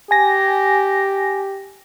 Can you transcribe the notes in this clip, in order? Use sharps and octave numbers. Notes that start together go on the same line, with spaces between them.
G4 G#5 A#6